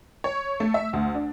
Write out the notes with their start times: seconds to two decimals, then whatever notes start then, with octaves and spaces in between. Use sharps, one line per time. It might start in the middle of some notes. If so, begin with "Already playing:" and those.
0.24 C#5
0.60 A3
0.74 E5
0.93 D2
1.14 D4